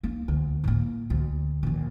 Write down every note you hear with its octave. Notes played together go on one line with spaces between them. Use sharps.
A#3 D#4
D2
A2 A#3
D2
A#1 D#3